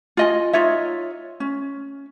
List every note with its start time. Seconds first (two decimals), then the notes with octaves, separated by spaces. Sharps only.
0.17 F4 D#5 G#5
0.53 D#4 F4 C#5 E5
1.40 C#4